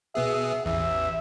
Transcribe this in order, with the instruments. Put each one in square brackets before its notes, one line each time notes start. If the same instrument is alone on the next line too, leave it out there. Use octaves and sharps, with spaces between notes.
[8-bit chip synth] B2 B3 G#4 [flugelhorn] E5
[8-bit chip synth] A1 E2 [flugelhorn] E5